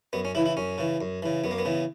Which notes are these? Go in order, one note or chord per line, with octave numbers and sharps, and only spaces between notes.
F#2 B3
C#4
C#3 E3 E4
E4
F#2 C#4
C#3 E3
F#2
C#3 E3
F#2 B3
A#3
B3
C#3 E3